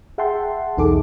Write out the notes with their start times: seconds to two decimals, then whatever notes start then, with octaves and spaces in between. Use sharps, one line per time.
0.18 G#4 E5 F#5 G5 A5 C6
0.77 B1 E2 D#4 G#4 A4 D6